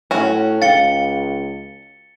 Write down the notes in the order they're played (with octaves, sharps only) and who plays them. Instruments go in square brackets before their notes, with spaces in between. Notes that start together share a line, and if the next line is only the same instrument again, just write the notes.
[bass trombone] A2 [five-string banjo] C#4 F#4
[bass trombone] C#2 [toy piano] F5 G5 [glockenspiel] A6 C#7 G7